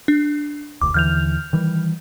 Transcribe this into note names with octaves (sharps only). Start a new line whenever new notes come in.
D4
E1 D2 D6
D#2 D3 E3 F6 G6 F7
D#3 E3 G3